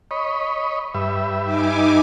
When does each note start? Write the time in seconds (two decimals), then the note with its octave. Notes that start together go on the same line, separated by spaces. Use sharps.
0.11 C#5 D#5 B5
0.94 G2 B4 E5
1.44 D#4 G#5 D6